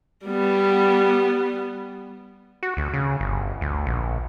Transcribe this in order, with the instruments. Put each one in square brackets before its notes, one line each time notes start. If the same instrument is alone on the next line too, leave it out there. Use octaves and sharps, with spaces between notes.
[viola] G3 B3
[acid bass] F#4
D2
C#3
G1
D2
A#1